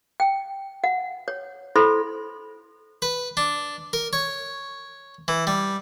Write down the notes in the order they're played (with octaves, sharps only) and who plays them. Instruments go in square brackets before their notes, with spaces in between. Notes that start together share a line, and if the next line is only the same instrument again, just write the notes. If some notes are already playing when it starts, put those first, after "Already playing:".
[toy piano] G5
F#5
C#5
E4 A4 C5 B5 C6
[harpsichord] B4
D4
A#4
C#5
E3
G3